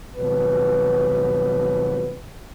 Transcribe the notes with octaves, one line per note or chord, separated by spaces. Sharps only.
G#1 D#2 B2 F3 F#3 B4